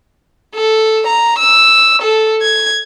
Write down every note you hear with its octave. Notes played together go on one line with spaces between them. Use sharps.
A4
A#5
E6
A4
G#6